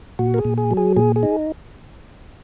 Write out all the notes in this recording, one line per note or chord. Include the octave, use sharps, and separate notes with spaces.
A#2 F#4
A#4
G#4
A#2
G#4
F#3
G#4
A#2 G#4
G#4
D#4